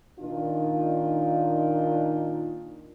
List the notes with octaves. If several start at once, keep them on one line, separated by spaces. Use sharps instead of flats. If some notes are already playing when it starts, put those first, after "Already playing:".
A#2 D#3 D4 D#4 F4